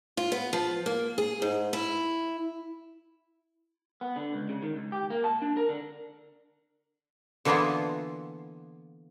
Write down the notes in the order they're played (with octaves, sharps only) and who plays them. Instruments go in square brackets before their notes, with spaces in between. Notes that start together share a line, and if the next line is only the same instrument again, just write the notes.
[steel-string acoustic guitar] F4
B3
F3
A#3
G#4
G#2
E4
[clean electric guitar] B3
D3
C#2
C#3
D#3
C#2
G4
A#3
A5
D4
A#4
D3
[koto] D3 E3 A#3 B3 E4 F4